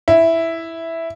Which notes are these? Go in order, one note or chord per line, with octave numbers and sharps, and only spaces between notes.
E4